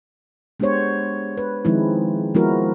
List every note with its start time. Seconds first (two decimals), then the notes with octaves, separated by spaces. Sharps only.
0.60 G#3 B3 D4 G4 C5 C#5
1.37 B4
1.65 D#3 F3 G#3 C4 D#4 E4
2.35 F3 G#3 B3 E4 F#4 A#4